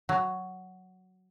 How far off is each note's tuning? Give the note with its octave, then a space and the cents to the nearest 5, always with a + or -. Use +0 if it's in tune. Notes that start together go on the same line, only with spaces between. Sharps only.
F#3 +5